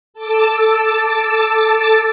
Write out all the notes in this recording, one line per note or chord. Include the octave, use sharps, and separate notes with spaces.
A4 A5 D6 E6 A6